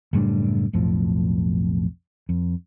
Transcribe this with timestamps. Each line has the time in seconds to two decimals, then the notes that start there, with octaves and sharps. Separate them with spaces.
0.13 F#1 A2 G3 D4
0.73 B1 F2 A2 F3
2.29 F2